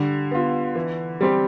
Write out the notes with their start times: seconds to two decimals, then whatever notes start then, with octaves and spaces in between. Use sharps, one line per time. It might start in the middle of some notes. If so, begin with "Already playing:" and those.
Already playing: D3 G3
0.31 B3 F4
0.75 E3
1.21 G3 C4 G4